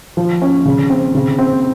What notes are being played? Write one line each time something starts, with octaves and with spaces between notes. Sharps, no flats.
F3
C#4
C#3
C4
C#3
C4